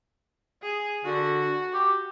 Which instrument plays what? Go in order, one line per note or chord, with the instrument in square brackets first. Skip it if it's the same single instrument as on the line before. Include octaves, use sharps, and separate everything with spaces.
[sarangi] G#4
[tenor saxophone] D3 [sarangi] F#4
[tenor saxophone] G4